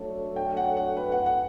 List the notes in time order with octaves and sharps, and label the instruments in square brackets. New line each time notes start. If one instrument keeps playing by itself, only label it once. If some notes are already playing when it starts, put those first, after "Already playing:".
Already playing: [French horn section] F#3 A3 D4 A4 C#5
[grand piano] G5
F#5
F#5
B4
F#5
F#5